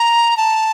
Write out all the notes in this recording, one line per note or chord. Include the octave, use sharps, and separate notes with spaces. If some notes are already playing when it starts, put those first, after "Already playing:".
Already playing: A#5
A5